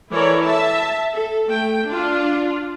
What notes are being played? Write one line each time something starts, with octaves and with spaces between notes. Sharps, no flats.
E3 E4 A4 A#4 C#5 D5
E5 A5
A4
A3 A4 G5
D4 F4